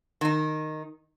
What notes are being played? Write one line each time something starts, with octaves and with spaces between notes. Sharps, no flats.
D#3 D#4